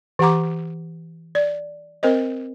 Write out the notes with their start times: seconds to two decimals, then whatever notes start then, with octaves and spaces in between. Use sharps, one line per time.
0.19 E3 G4 F#5 A#5 D6
1.35 D5
2.03 C4 A#4 C5 D#5